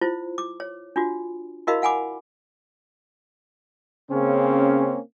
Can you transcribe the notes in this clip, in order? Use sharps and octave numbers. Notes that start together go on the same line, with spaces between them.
E4 F4 C5
D6
C#5
D4 F4 F#4
E4 F#4 A#4 D#5 F5 B5
F5 F#5 G#5 B5 D6
C#3 A#3 C4 C#4